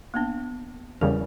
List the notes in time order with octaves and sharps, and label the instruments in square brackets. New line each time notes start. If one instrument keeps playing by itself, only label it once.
[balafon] A#3 B3 D4
[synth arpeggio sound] E2 C#3 G3 [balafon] A#4